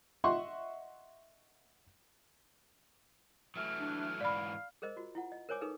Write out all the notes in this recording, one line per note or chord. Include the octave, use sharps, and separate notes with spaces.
D#5 E5 F#5 C6 C#6
E3 F#3 A3 F6
D4
G#2 E3 D5 F5 B5
G#4 A#4 C5 D#5
F4 F#4
E4 F4 F#5
D#5
A#4 C5 C#5 G#5 D6
D#4 G#4 A4 B4